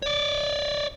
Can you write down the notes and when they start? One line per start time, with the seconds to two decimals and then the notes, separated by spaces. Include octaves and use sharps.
0.02 C#5 D5